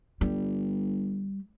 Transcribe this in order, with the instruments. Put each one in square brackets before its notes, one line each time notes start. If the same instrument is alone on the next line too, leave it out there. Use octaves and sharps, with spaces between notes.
[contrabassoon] G1 [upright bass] G3